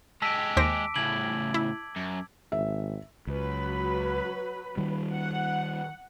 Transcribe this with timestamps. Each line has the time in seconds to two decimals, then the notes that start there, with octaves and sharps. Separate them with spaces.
0.22 G#3 G4 A5 E6 B6
0.57 D#2 C5 D6 A#6 B6 D7
0.96 A2 C#3 G#6 F#7
1.54 E4
1.96 F#2
2.52 G#1 E5
3.27 C#2 F#3 B4 B5
4.77 D#3 G3
5.12 F#5